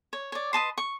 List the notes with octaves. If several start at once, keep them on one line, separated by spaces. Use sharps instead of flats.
C#5
C#5 D5
B4 D#5 A5 C6
C#6